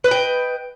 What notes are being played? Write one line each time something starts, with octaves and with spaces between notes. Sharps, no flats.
B4 D#5 G5